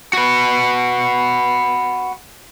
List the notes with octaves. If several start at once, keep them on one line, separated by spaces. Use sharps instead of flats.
F#4 B4